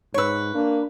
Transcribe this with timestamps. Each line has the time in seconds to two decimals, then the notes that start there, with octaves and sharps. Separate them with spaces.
0.14 G#2 B4 C#5 C#6 E6
0.54 A#3 D4